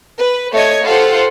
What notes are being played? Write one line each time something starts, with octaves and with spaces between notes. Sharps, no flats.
B4
A3 C#5 D#5 G#6
F4 G4 A4 C5 F#5